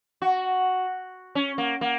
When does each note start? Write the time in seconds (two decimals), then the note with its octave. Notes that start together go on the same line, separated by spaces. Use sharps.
0.22 F#4
1.35 C#4
1.58 A#3
1.81 A#3